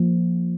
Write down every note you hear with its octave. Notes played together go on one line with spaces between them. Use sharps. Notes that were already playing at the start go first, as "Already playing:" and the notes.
Already playing: F3 A#3